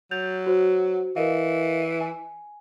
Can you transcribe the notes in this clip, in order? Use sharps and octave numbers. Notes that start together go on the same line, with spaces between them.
F#3 G6 A6 F7
F#4 C5
E3 A#4 D#5 F5
G#5